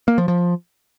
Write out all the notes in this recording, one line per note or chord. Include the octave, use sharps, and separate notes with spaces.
A#3
F3
F3